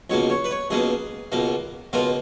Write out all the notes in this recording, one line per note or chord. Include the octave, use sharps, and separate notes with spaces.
C#2 B2 A#3 C#5
C#5
B4
C#5
C#2 B2 A#3 G#4
C#2 B2 A#3
C#2 B2 A#3 F4